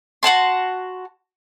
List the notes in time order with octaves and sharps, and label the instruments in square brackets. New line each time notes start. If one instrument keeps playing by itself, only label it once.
[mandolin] F#4 F#5 A5 C6